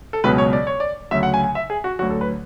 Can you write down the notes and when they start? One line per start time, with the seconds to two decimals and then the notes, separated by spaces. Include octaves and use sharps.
0.13 A4
0.24 C#2 B2 F#3 B4
0.38 C#5
0.53 D5
0.67 C#5
0.80 D5
1.11 D2 C#3 F#3 E5
1.23 F#5
1.34 G#5
1.44 G#5
1.55 E5
1.70 G#4
1.84 F#4
1.99 D2 D3 F#3 F#4
2.10 A4
2.21 B4